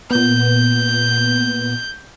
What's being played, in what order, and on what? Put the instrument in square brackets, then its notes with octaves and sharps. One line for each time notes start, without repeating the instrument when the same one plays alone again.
[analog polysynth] A#2 B3 [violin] G6